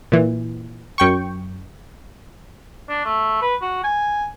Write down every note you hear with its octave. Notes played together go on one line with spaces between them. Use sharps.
A#2 E3
F#2 G5 C#6
D4
A3
B4
F#4
G#5